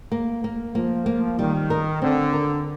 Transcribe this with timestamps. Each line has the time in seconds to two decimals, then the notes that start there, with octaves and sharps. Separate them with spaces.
0.12 A#3
0.44 A#3
0.75 F3 A#3
1.06 A#3
1.38 D#3 G3
1.70 A#4
2.01 D3 C4
2.33 A#4